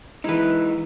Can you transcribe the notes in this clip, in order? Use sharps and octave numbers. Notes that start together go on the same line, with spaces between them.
E3 G#3 D#4 E4 B4